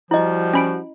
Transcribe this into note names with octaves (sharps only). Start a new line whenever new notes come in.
F3 G3 E4 F#4 D#5
C#4 B5 D7